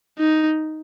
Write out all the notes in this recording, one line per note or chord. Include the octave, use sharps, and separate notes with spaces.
D#4